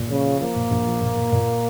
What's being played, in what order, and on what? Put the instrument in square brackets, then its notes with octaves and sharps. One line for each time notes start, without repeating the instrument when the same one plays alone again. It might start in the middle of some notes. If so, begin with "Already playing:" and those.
Already playing: [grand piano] A#2
[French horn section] C#3 [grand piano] F3
[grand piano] F3
[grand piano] F3 [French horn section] A#3
[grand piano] A#2
A#1
F3
A#2
A#2
A#2